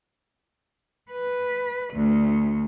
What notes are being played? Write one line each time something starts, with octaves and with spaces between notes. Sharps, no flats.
B4
D2